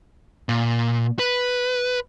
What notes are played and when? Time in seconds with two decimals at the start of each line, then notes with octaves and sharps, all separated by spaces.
0.49 A#2
1.19 B4